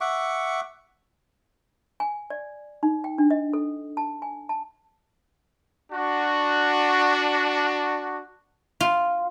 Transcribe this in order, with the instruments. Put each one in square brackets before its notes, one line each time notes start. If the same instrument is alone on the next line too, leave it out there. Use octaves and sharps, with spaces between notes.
[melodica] E5 F#5 C#6 D6
[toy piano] G#5
D5
D#4
G5
D4
D#5
A4
A5
G#5
A5
[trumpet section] D4 F#4
[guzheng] F4